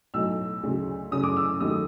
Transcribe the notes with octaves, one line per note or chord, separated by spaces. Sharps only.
B1 A2 F#3 E6
D2 C#3 F#3
F#2 C#3 E3 A3 C#4 D#6
D6
E6
D#2 D#3 F#3 A3 D#6